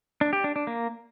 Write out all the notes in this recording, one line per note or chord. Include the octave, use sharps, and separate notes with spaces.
D4
G4
D4
D4
A#3